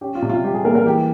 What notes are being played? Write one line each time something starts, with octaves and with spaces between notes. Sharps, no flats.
C#4 G4
F4
C3
F4
G3 G4
G#4
A#3 A#4
A#4
E3 G4